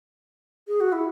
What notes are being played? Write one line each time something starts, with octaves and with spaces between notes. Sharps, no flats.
G#4
F#4
E4